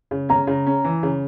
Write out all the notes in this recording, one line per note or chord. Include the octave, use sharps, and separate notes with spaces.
C#3
C#4 A#5
C#3
C#4
E3
C#3